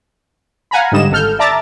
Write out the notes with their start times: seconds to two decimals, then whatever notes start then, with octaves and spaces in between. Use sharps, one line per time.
0.71 F5 F#5 G#5 A#5 B5
0.92 G#2 D3 G3 D#5 E7
1.11 G#1 A4 F6 G6
1.39 D5 E5 A5 A#5 D6 A6